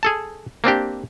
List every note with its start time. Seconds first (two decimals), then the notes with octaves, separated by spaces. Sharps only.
0.03 G#4 A4 A5
0.64 A#3 C4 D4 G4